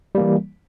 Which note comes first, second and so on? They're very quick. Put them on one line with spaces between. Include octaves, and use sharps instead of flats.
G3 A#3 E3